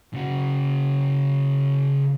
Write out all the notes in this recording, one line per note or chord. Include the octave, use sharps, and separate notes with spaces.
C#3 F#4